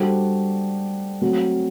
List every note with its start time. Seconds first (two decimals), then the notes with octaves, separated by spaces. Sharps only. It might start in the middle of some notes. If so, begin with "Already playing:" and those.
Already playing: G3 D4 F#4 A4 C5
1.21 F#3 A3 C4 F#4